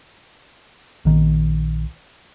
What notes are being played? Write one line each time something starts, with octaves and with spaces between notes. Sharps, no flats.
A#1 D#3